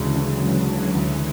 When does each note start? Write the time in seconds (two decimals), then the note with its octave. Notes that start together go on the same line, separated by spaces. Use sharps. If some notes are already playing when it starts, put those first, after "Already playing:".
Already playing: D2 C#3 E3 G#3 D4
0.15 D3 F#3
0.42 G#3
0.68 D4
0.95 D2 E3